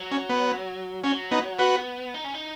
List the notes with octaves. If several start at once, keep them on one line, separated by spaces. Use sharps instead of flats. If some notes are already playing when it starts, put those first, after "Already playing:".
Already playing: F#3
C#4
B3
F#3 C#4
B3 D#4
B3 F#4 B4
D#4
C#4
D#4